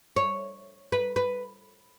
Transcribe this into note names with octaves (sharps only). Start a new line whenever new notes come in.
C#5
B4
B4